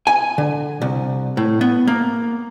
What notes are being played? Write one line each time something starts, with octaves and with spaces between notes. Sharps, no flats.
G#5
D3
C2
A2
B3
A#3